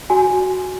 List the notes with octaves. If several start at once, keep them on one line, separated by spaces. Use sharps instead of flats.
F#4 G#5